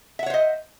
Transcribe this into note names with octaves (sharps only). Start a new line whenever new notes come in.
C5 C#5 D#5 E5 F#5